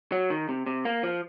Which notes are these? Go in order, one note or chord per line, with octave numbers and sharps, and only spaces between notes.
F#3
D#3
C3
C3
A#3
F3